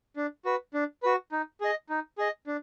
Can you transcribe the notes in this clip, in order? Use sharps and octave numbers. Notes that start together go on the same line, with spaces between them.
D4
F#4 B4
D4
F#4 B4
D#4
G#4 D#5
D#4
G#4 D#5
D4